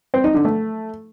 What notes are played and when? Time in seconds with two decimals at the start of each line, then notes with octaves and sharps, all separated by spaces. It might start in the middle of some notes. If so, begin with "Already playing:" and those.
0.14 C4
0.24 D#4
0.34 D3
0.45 A3